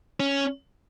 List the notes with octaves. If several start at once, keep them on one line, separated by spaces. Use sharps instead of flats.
C#4